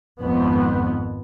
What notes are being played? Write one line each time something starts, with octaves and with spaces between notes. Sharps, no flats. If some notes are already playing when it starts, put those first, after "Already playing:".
G#1 F2 B3